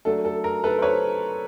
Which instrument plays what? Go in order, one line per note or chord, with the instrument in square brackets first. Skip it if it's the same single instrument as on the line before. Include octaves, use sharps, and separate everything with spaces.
[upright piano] F#3 A3 D4 A4
A4
A#4
A4 B4
C5
B4 C#5